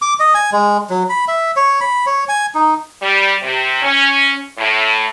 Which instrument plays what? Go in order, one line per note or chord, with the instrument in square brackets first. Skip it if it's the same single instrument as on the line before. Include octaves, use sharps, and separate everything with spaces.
[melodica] D6
D#5
G#5
G#3
F#3
B5
E5
C#5
B5
C#5
G#5
D#4
[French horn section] G3
C3
C#4
A2